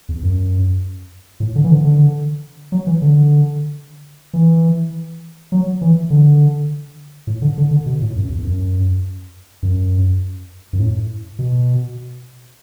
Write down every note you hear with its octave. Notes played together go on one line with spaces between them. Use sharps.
E2
F#2
A2
D3
E3
D3
D3
F#3
E3
D3
E3
F#3
E3
D3
A2
D3
D3
D3
B2
A2
F#2
E2
F#2
F#2
F#2
A2
B2